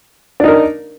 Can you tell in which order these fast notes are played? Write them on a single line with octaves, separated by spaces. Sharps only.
D4 D#4 A#4